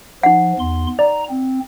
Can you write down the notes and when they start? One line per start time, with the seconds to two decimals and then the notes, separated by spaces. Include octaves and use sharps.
0.23 F3 D#4 F#5
0.59 E2 C6
0.99 D5 A#5
1.30 C4